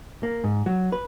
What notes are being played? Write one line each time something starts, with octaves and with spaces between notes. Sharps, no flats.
A#3
G#2
F#3
B4